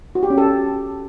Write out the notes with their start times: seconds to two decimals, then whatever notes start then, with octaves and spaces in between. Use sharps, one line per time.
0.15 F#4
0.23 G4
0.30 C#4
0.38 A4